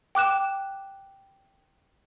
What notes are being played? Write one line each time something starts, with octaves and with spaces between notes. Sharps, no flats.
G5 D6 F#6 E7